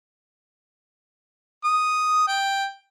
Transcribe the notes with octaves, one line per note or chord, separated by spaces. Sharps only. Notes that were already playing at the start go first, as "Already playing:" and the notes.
D#6
G5